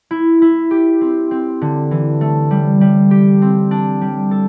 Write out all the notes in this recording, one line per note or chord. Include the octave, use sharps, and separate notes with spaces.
E4
E4
G4
C4
C4
D3
E3
A3
G3
G3
G4
C4
D4
G3
A4